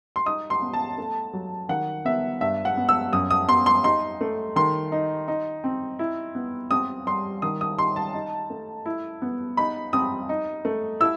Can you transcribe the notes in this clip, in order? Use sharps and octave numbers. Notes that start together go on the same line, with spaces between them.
C6
D#4 D#6
C6
B3
A5
A3
F#3
D#3 F#5
B3 E5
G2 E5
F#5
B3
E6
F#2 D#6
D#6
B3 C6
C6
D#4 C6
A3
D#3 C6
D#4
D#4
C4
E4
B3
C4 D#6
G3 C6
D#3 D#6
D#6
D#4 C6
A5
D#4
A3
E4
B3
D#4 B5
C4 D#6
D#4
A3
E4 E6